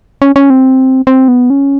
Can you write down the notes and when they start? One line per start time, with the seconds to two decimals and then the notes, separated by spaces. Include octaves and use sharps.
0.22 C#4
0.36 C#4
0.50 C4
1.07 C4
1.28 B3
1.50 C#4